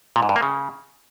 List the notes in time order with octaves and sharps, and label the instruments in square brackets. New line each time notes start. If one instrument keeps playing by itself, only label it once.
[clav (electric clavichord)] A#2
G#2
G2
A#3
C#3